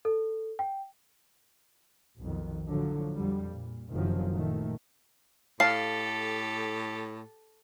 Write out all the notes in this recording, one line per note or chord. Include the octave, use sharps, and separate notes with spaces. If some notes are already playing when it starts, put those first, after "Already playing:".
A4
G5
B1 F2 D#3
A2 D3 F3 F#3
F2 D3 G3
A#2
F#1 C3 D#3 F3 F#3
A#2 D#3 A3
A2 G4 A4 F5 A5 C7